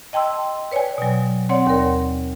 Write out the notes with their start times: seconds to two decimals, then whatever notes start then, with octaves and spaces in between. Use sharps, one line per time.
0.13 D#5 G5 A5 C6 E6
0.71 B4 C#5 D5 G5 G#5
0.98 B2 F#3
1.49 C4 C#5 D5 F#5 C6
1.67 D#2 A#4